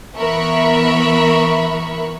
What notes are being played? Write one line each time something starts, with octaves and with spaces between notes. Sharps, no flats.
E3 B3 A#4 E5 B5 C#6